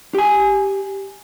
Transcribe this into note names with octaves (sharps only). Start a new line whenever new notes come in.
G4 G#5